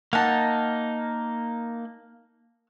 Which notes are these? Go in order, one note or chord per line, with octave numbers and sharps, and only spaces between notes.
A#3 D#4 F#5 A5